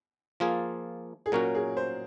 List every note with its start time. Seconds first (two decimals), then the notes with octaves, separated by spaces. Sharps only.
0.40 F3 A#3 F4 G#4
1.26 G#4
1.32 A#2 F#3 C#4 F#4 A#4
1.55 G#4
1.77 C5